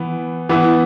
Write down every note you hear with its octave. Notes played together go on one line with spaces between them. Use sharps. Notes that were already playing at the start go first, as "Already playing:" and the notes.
Already playing: E3 B3
E3 B3 E4